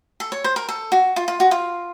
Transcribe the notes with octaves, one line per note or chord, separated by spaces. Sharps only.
A4
C#5
C5
A#4
A4
F#4
F4
F4
F#4
F4